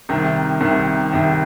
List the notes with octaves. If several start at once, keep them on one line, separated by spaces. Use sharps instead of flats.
C2 C3 D#3
C2 C3 D#3
C2 C3 D#3